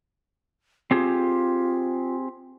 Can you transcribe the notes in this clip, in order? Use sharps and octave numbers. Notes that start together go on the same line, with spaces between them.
C4 F4 G4 G#4